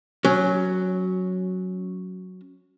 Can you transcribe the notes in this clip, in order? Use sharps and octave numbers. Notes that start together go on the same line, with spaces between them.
F#3 C#4